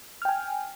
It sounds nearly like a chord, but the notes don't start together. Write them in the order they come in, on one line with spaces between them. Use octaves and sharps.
F6 G5 G#5